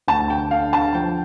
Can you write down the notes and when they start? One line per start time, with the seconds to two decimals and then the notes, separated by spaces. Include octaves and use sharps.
0.08 D2 A5
0.30 G5
0.51 D3 F5
0.73 A5
0.95 F3 G5